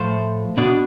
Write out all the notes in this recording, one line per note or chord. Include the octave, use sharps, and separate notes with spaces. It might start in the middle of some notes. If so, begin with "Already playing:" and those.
Already playing: A2 F3 A3 C5
B2 B3 D4 D5